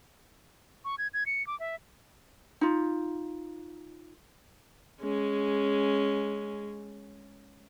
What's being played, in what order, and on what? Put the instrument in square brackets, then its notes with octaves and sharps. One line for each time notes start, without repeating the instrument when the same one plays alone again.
[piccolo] C#6
G#6
G#6
C#7
D6
E5
[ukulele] D#4 F4
[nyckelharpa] G#3 C#4